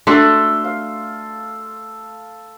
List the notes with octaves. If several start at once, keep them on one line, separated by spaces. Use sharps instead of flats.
A3 D4 F#4 A4 C6
F5